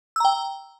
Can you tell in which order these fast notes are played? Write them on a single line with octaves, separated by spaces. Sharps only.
E6 A#5 G5